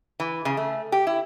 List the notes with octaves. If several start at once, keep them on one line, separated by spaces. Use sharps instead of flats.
E3
C#3
A3
G4
E4